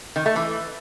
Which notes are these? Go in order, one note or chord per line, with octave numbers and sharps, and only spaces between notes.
D#3
A3
E3